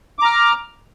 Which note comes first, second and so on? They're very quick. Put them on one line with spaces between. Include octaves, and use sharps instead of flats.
D6 A#5 F6